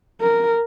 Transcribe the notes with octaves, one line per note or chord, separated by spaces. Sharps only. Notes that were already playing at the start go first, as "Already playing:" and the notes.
A#4